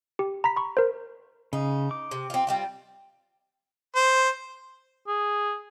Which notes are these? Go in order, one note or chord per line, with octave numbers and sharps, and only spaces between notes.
G4
A#5 B5 B6
B5 C#6
A#4 C5
C#3 D#4
D6
C3
C4 F4
G3 C4 F4
C5
G#4